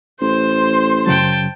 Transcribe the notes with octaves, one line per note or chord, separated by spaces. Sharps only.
A1 C5 C6
F#2 C#3 F#3 G5 A5